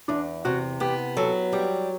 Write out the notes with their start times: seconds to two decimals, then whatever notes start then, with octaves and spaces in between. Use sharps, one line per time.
0.08 E2 D4
0.45 C3 F#4
0.80 B3 G4
1.17 F#3 A4
1.53 G3 G4